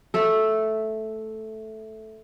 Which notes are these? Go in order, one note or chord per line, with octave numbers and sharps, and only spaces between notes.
A3 A4